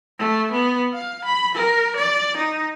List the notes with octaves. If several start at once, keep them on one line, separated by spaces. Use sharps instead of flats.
A3
B3
F5
B5
A#4
D5
D#4